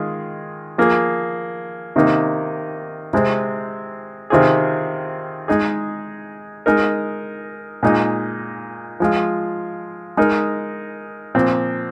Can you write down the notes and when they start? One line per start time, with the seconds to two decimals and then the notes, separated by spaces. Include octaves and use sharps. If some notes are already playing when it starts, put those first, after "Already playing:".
Already playing: D#3 G#3 F4 G#4
0.78 F3 A#3 G#4
1.96 C3 D#3 A#3 D#4 A#4
3.13 C3 G#3 C4
4.30 C3 D#3 C4 F4 G#4
5.48 G#3 D#4 G#4
6.66 G#3 D#4 A#4
7.83 A#2 G#3 D#4
9.00 F3 G#3 F4
10.17 G#3 D#4 A#4
11.35 A#2 F3 C4